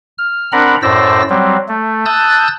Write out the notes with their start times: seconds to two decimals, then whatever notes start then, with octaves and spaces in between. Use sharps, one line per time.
0.18 F6
0.52 C4 D4 A#4 F#5 A#5 B5
0.82 F#2 A2 C5 D5 E6 A#6
1.30 F#3 G3 C4
1.68 A3
2.06 A5 D#6 E6 F#6 G6 A6